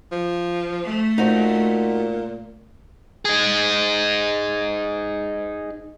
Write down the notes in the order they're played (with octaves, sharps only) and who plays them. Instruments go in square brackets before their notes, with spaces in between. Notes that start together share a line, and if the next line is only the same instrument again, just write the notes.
[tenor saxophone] F3
[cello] A3
[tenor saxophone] A#2 [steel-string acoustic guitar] D#4 F#4 C5
[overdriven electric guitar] D#4 G#4